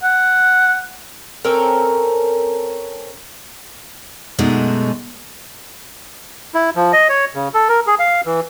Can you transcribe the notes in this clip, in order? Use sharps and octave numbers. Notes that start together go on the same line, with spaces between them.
F#5
C4 C#4 A4 A#4
F#2 B2 G#3 A3 D4 D#4
E4
F3
D#5
C#5
C#3
A4
A#4
G#4
F5
E3